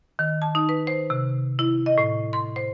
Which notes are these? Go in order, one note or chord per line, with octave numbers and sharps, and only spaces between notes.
D#3
A5
D#4
B4
C5
C3
E4
D#5
A2
C6
C5